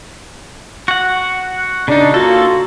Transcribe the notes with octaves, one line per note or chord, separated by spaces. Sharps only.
F#4 F#5
C#3 D4 D#4
A#3 F4 F#4 A4